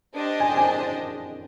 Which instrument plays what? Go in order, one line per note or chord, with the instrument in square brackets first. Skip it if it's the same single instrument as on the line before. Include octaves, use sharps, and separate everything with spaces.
[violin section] D4 G4 C5 D#5
[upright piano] G#5
G5
G#5